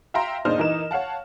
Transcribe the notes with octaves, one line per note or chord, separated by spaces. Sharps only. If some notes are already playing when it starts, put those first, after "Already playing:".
E5 F5 G5 A#5 C6 A#6
F#1 A#2 D4 D#4 C5 F6
E3 D#4 A#4 E7
C#5 F5 F#5 A5